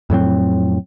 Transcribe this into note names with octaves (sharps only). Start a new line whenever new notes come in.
F2 A2 F#3 C4